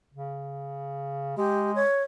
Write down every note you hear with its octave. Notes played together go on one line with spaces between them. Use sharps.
C#3
G#3 G4
C#5